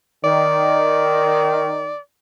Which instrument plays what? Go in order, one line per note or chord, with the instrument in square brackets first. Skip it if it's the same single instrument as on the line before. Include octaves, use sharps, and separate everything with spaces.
[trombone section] D#3 [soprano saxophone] D5